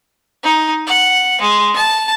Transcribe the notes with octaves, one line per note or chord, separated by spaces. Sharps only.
D#4
F#5
G#3
A5